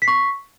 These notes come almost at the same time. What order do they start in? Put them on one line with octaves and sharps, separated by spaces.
B6 C7 C#6